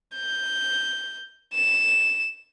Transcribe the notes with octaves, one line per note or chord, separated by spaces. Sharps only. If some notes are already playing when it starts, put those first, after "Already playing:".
G6
E7